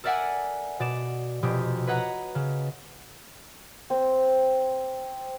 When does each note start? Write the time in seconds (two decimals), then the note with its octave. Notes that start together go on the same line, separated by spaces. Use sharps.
0.04 A4 A#4 D5 E5 F#5 G#5
0.80 B2 D5 E7
1.42 F1 B2 G4 D#6
1.87 B4 C#5 D#5 F#5 A#5
2.35 C#3
3.90 C4